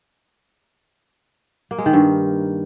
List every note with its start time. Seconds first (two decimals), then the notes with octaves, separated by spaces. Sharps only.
1.71 A#3
1.78 G#3
1.86 D#3
1.93 G2